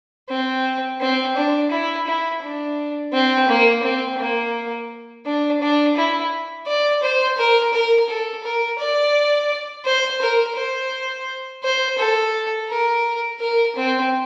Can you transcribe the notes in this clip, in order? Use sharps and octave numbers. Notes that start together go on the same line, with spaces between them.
C4
C4
D4
E4
E4
D4
C4
A#3
C4
A#3
D4
D4
E4
D5
C5
A#4
A#4
A4
A#4
D5
C5
A#4
C5
C5
A4
A#4
A#4
C4